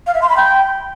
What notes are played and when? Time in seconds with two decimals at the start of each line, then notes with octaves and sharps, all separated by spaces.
0.07 F5
0.14 E5
0.22 C6
0.29 B5
0.37 G5